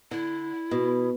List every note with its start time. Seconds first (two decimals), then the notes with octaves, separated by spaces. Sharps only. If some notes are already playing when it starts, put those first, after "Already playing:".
0.11 D3 E4
0.71 B2